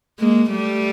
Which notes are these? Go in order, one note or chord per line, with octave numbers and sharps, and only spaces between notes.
G#3 A#3
G3 A3